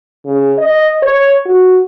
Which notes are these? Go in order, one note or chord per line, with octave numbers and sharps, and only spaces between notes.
C#3
D#5
C#5
F#4